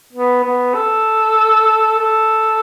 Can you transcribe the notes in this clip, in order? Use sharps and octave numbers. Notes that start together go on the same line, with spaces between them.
B3
B3
A4
A4